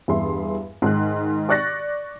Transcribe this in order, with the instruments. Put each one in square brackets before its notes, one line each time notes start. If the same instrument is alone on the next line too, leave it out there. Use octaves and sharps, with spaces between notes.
[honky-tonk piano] E2 G2 G#4 E5 C6
G#2 D#3 F#6
D5 C#6 F#6 A6 A#6